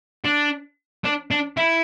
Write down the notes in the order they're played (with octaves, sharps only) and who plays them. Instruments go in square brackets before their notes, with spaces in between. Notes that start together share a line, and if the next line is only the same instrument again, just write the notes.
[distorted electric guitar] D4
D4
D4
E4